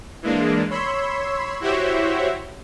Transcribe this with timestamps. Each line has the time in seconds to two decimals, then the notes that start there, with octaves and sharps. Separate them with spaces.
0.22 E3 G#3 A#3 D4
0.70 C#5 B5 C6 E6
1.60 E4 F#4 G4 C5 C#5 E5